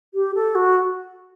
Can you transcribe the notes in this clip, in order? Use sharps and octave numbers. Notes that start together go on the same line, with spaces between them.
G4
A4
F#4